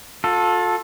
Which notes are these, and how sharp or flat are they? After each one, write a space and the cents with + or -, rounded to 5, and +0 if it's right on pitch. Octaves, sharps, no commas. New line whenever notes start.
F4 +40 A4 +0